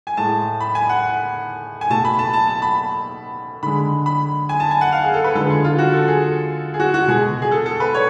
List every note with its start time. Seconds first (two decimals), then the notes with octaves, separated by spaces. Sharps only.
0.07 G#5
0.17 A2 G#3 A5
0.60 B5
0.75 G#5
0.89 F#5
1.81 G#5
1.90 B2 A3 A5
2.05 B5
2.19 A5
2.33 A5
2.47 A5
2.62 B5
3.63 D3 G#3 B5
4.06 B5
4.49 G#5
4.60 A5
4.71 G#5
4.81 F#5
4.92 F5
5.04 G#4
5.14 A4
5.24 B4
5.35 D3 F3 G#3 A4
5.50 G#4
5.64 F4
5.78 F#4
5.94 A4
6.08 G#4
6.74 G#4
6.80 F#4
6.94 F#4
7.08 B2 G#3 G#4
7.42 G#4
7.51 A4
7.66 A4
7.80 B4
7.94 C#5